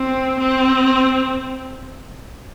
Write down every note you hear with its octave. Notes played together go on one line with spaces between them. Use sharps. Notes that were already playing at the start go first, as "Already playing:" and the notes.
Already playing: C4
C4